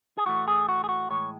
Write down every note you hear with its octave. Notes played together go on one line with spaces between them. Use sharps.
G#4
A2 E3 A3 F#4
G#4
F#4
G#4
F#4
A2 E3 G#3 C#5